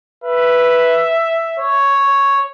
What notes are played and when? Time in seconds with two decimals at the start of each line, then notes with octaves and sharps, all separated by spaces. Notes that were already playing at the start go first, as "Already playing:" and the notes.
0.24 B4 E5
1.60 C#5